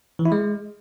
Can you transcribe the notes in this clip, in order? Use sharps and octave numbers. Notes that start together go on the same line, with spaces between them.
E3
E4
G#3